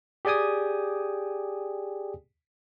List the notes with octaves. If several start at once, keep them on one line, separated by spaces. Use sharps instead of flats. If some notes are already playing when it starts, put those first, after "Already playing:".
G4 G#4 D5 G5 G#5 D#6